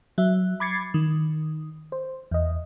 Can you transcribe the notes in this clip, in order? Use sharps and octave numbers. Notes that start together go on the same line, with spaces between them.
F#3 E5
B5 D6 G#6 A6 C7 C#7
D#3
C5
E2 D#5